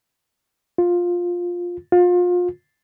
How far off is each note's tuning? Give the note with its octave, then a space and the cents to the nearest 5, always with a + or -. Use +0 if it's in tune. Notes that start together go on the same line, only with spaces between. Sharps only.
F4 +10
F4 +30